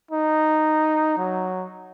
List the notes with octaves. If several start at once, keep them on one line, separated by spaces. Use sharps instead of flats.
D#4
F#3